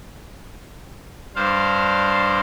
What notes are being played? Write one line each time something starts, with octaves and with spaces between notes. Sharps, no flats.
G2 D4 C5 F5